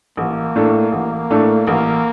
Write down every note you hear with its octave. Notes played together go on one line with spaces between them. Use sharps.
A1 A#3
A2 A3 D4 A4
A1
A2 A3 D4 A4
A1 A#3